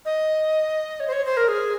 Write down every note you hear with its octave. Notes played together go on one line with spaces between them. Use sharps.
D#5
C#5
C5
C#5
C5
A#4
G#4